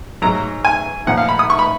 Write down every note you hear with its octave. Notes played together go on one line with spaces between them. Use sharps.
G#2 F#3 A#5
G#5
A#2 F3 F#5
F5
B5
D#6
C#6
B5